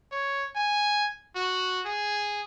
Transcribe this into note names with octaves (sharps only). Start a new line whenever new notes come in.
C#5
G#5
F#4
G#4